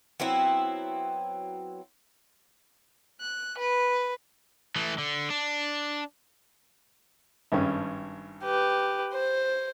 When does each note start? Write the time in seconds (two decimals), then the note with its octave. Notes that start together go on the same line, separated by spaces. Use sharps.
0.20 F#3 B3 C4 E4
3.22 F#6
3.59 B4
4.76 E3 A3
4.98 D3
5.30 D4
7.52 G#1 G2 C#4
8.44 G4 B4
9.13 C5